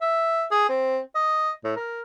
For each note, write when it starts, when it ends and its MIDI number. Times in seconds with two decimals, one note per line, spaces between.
0.01 0.45 76
0.51 0.69 68
0.69 0.99 60
1.15 1.51 75
1.64 1.72 45
1.76 2.01 70